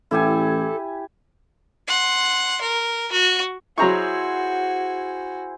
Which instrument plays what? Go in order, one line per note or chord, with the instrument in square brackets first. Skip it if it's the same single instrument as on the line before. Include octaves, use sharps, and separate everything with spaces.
[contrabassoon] A1 [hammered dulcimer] E4 G4 G#5 [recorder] A4
[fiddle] F#5 C6
A#4
F#4
[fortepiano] F#3 A#5 C#6 [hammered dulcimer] E4 G#4 C5 [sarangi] F#4